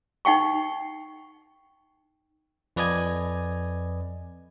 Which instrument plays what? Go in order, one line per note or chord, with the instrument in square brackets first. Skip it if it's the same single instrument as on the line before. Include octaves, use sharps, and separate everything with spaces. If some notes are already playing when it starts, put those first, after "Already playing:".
[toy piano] D#4 F#5 G5 C#6
[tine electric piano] F2 B4 D5 D#5 G#5 G#6